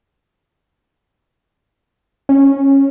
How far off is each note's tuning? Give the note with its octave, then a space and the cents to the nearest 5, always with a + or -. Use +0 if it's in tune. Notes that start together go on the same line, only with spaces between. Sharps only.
C#4 -15